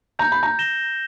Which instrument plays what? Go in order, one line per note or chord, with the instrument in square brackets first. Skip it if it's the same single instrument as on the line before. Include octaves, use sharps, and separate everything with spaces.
[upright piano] A#5 [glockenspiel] G6
[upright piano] B5
A#5
[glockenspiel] A#6 E7 G7